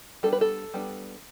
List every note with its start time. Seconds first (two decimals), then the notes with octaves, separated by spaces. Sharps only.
0.23 G3 B3 D4 A4
0.33 B4
0.41 A4
0.74 G3 B3 D4